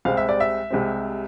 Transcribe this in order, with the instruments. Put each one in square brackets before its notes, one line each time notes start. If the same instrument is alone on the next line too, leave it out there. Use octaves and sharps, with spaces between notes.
[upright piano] C2 C3 G#3 C4 F5
E5
D5
E5
C2 C3 G#3 C4